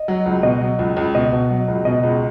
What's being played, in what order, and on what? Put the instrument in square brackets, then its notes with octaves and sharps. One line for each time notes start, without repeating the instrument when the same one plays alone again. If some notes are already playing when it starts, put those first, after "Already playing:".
Already playing: [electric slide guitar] D#5
[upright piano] F#3
C#2
[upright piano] B2 [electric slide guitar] D#5
[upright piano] F#3
C#2
C#2
[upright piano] B2 [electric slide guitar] D#5
[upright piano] B2
F#3
C#2
[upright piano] B2 [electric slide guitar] D#5
[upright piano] C#2